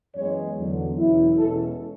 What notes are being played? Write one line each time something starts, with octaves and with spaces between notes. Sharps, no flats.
F#2 E3 G#3 B3 C#5
E2 D3 F#3
E2 B2 F#3 C#4 E4
E2 B2 G#3 C#4 E4 A4